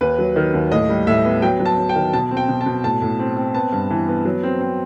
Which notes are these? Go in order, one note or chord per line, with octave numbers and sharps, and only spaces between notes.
D#2 B4
F#3
D#3
D#2
A2 D#5
G3
A2 E5
B3
F#3 G5
F#3
A5
F#3
G5
D#3
B2 A5
C4
G5
B2
A5
B2
A2 A5
A2
C4
C4
B3 A5
G2
E3
B3
F#3
C4
C4